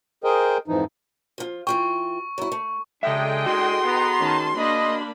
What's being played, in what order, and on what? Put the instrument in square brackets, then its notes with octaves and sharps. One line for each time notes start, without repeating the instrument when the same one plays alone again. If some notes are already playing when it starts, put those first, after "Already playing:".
[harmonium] G#4 A#4 C5 D#5 G5
F2 G#2 E3 F3 D#4
[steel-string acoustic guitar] F3 F4
[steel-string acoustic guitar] E3 F4 G5 [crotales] C#6
[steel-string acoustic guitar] F#3 E4
A3
[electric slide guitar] C#3 E5 [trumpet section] G#3 D4 [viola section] A4 D#5 G5
[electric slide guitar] F#4 G#4 [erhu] C6
[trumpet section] B3 A#5
[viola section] D#3 C#4 A5
[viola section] A#3 D4 B5 [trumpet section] D#5